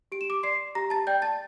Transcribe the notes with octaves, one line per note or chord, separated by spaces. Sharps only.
G4 D7
E7
D6 D7
D5 C6 C7
G4 A#5 A#6
A5 A6
D5 G5 G6
A5 A6